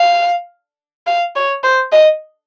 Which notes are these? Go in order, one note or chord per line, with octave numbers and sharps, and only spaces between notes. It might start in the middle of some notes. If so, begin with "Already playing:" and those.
Already playing: F5
F5
C#5
C5
D#5